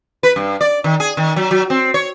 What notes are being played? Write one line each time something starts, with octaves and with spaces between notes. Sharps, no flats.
B4
G2
D5
D#3
G#4
D#3
F#3
F#3
C4
C#5